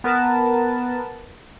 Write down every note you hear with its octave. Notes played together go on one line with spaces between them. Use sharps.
B3 A#4 B4 A5